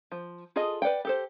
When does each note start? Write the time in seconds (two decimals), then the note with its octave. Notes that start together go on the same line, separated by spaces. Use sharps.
0.12 F3
0.56 F4 G#4 A4 D#5
0.82 B4 D5 F#5 G5
1.05 G4 A4 C5